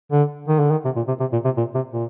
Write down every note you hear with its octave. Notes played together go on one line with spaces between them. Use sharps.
D3
D#3
D3
D#3
C3
A#2
C3
C3
A#2
C3
A#2
C3
A#2